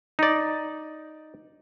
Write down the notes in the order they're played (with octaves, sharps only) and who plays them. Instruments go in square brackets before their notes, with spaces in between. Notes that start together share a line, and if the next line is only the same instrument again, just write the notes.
[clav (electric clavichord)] D#4 D5